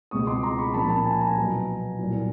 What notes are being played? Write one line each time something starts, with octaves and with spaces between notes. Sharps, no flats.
C#2 B2 G#3 C4 C#6 D#6
C6 D6
A#5 C6
B5 C#6
A#2 F3 A#3 C#4 A5 B5
A5 B5
G#5 A#5
G#5 A#5
B2 F#3 B3
C2 A#2 F#3